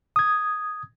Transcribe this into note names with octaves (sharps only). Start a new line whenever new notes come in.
D#6 G#6